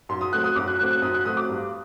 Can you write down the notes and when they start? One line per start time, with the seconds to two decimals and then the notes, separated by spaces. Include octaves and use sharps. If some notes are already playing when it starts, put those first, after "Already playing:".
0.09 F#2 C6
0.21 D#6
0.32 F#3 A3 C4 F#6
0.44 D#6
0.56 F#2 D6
0.67 F#6
0.79 F#3 A3 C4 F#6
0.91 F#6
1.02 F#2 D#6
1.14 F#6
1.25 F#3 A3 C4 D#6
1.37 D6
1.49 G2